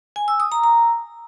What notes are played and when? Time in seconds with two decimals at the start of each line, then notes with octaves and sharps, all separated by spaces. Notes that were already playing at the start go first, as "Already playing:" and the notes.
0.16 G#5
0.28 E6
0.40 D#6
0.52 A#5
0.64 A#5